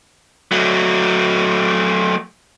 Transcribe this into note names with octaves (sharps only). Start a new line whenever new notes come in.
F#3 A3